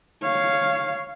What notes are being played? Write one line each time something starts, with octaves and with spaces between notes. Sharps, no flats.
C#5 F5